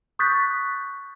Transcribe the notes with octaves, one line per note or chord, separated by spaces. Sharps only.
C#6 D#6 F#6 G6 A6 B6